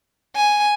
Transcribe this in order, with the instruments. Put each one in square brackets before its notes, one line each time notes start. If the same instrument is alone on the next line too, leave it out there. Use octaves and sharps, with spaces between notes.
[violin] G#5